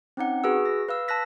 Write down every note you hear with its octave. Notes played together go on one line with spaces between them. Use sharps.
C4 C#4 D#4 F#5
F#4 G#4 B4 E6
A#6
B4 F5 E6
A5 E6 F#6 A#6 B6